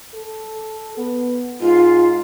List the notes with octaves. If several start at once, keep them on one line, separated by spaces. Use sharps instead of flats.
A4
B3
G#2 F4